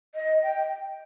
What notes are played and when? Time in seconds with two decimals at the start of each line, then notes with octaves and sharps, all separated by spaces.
0.15 D#5
0.43 G5